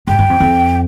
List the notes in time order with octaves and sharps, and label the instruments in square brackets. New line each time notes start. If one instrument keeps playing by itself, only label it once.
[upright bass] G2 [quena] G5
[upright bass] G2
F2
F2